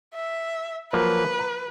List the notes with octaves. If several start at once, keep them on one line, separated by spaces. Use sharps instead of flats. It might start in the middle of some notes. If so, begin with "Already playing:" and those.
E5
F3 F#3 A#3 B4
A#5